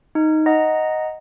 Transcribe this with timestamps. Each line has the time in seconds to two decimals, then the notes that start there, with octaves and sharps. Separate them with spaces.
0.15 D#4
0.46 D#5 F#5 A#5